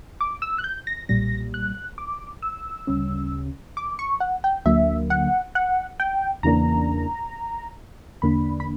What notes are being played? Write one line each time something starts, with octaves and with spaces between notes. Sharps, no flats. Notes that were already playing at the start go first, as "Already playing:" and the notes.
D6
E6
F#6
G6
A#6
B1 A#2 G3 A#6
F#6
D6
E6
D2 C#3 G3 C#4
D6
C#6
F#5
G5
D2 D3 F#3 A#3 E5
F#5
F#5
G5
E2 C#3 E3 A#3 D4 A#5
E2 D3 A#3 D4 B5
B5